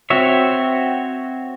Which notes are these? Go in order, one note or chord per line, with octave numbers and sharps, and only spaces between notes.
C4 F#4 C#5 E5